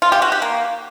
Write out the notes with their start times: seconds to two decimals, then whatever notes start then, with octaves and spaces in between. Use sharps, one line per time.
0.02 F4
0.12 G4
0.22 F#4
0.32 G4
0.42 A#3